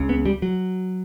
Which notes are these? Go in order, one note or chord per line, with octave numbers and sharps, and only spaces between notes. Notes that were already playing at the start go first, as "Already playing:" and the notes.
Already playing: C#2 C#3
B3
G3
F#3